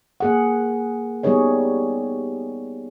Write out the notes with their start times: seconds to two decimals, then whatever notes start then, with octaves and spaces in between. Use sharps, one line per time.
0.20 A#3 G#4 F#5
1.23 G3 B3 D#4 G#4 C#5 D#5